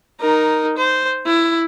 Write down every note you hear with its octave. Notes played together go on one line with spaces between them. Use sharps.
D#4 A#4
C5
E4